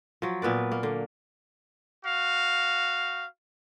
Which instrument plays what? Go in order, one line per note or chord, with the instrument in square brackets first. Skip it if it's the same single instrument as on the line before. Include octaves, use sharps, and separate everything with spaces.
[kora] F3 F#3
A#2 B3 B4 D5
A#3
D3
[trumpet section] F#4 F5